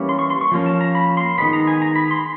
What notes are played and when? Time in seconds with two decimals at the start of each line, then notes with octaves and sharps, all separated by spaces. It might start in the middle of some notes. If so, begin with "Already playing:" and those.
Already playing: E3 G3 A#3 C#4
0.09 C6
0.19 C#6
0.30 C6
0.41 C#6
0.52 F3 A#3 C#4
0.66 A5
0.81 A#5
0.95 B5
1.17 C6
1.38 D#3 G#3 B3 B5
1.53 A#5
1.67 G#5
1.82 A#5
1.95 B5
2.11 C6